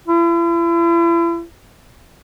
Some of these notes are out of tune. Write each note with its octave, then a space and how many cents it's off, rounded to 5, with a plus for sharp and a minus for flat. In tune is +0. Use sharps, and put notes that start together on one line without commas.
E4 +40